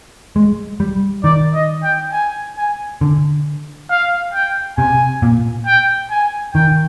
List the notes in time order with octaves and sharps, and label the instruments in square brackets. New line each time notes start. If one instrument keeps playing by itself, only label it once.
[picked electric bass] G#3
G3
[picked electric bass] D#3 [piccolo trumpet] D5
[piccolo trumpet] D#5
G5
G#5
G#5
[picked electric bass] D3
[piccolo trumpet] F5
G5
[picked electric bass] C3 [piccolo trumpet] G#5
[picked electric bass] A#2
[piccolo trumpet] G5
G#5
[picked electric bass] D#3 [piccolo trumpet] G5